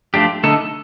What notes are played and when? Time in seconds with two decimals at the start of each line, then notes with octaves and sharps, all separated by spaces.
0.14 F3 A3 D4 G4
0.44 D3 A3 D#4 A4